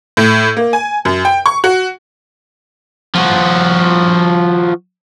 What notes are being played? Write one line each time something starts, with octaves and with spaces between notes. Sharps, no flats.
A2
A#3
G#5
F#2
G5
C#6
F#4
F3 F#4